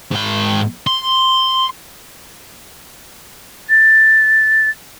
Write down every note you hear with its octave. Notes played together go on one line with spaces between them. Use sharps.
G#2 G5
C6
A6